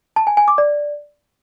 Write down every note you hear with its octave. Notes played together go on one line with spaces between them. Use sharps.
A5
G#5
G#5
D6
D5